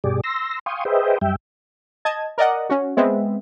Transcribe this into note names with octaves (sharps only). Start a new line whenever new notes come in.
G2 B2 G4 G#4 D5
C6 E6 A#6
F5 G5 G#5 C6 C#6 D#6
G#4 B4 C5 D#5 E5 G5
F#2 G3 E5 G5
D#5 A5 G#6
A#4 D5 D#5 F#5
C#4 F#4
G#3 B3 C4 E5